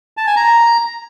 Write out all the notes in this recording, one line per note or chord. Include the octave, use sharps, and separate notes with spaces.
A5
G#5
A#5